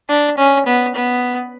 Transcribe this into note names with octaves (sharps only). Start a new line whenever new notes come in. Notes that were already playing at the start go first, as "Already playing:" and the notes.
D4
C#4
B3
B3